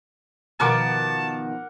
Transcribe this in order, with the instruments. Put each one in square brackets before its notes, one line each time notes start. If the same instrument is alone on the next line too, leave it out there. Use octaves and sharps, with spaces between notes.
[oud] B2 D#3 F3 [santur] A#4 F#5 D6 [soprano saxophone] A5